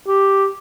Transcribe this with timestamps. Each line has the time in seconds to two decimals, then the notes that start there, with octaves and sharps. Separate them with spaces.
0.07 G4